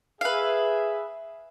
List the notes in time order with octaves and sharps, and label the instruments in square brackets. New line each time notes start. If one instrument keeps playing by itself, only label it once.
[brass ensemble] G#4 E5 [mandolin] B4 F5